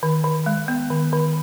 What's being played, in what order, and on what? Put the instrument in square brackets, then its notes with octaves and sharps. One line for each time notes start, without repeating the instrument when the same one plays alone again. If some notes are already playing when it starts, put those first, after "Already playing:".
[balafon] D#3
D#3
G#3
B3
D#3
D#3